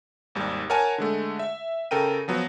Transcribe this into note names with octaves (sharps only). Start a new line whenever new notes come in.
G#1 D#2 G3
A#4 C#5 F#5 G#5 A5
D3 G#3 A3
E5
C#3 A4 A#4 G5 D#7
F3 F#3 B3